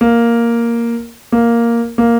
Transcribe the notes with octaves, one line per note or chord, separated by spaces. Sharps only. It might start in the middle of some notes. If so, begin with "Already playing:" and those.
A#3
A#3
A#3